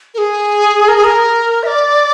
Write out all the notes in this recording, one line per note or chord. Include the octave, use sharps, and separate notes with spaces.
A#4
G#4
A#4
G#4
A#4
E5
D5